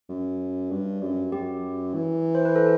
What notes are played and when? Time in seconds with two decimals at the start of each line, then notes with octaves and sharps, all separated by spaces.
0.09 F#2
0.71 G2
1.01 F#2
1.32 F#2 G4
1.94 E3
2.35 C5
2.45 B4
2.56 A4